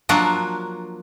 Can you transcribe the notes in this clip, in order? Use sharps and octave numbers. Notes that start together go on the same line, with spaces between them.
F3 F#3 A#3 D4